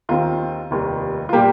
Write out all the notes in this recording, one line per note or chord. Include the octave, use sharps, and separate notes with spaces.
D#2 D#3 C4 F4
F1 D#2 D#3 G3
F4
A#2 G3 A#3 G4